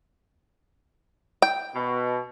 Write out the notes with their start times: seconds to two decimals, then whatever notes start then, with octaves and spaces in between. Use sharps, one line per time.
1.42 G5
1.75 B2